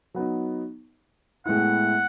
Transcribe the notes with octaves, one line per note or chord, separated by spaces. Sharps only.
F#3 B3 D#4
A2 G#3 B3 E4 F#5